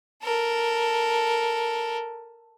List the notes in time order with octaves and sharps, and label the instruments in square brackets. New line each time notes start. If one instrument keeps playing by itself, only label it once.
[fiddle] A4 A#4